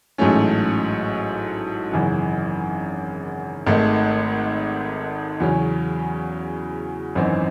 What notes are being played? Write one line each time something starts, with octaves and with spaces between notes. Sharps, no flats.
A1 G#2 F#3 A3 C#4
G#1 F#2 C#3 E3
G#1 G#2 D#3 A3
E2 C#3 F#3 C#4
G#1 F#2 E3 C4 D#4